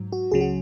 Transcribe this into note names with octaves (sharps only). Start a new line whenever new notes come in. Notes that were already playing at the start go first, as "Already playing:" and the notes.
Already playing: G#2 F#3
F#4
C#2 C#3 F#3 G#4
F#4